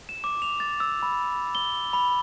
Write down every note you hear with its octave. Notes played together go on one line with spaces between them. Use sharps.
E7
D6
F7
A6
E6
B5
G7
B5